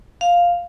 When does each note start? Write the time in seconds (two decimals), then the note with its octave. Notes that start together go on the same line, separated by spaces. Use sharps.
0.21 F5